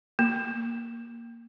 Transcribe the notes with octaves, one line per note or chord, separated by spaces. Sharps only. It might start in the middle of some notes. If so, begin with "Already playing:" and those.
A#3